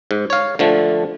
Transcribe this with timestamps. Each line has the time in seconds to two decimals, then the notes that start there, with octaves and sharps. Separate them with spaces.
0.11 G#2
0.30 C#5 F5
0.59 D3 F3 A3